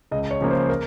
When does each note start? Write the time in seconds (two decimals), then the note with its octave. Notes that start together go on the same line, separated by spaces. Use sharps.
0.11 C#2 D#5
0.31 C#5
0.41 C#3 F3 A#3
0.51 C5
0.69 A#4